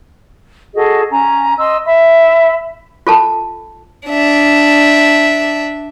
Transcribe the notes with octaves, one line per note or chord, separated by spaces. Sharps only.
F#4 G#4 A4 D#5
C#4 G#5 A#5
D#5 C6 E6
E5 B5
F4 A4 A5
D4 E5